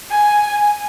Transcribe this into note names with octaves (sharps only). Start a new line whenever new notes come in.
G#5